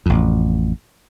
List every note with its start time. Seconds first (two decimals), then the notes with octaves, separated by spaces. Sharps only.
0.06 A1 F2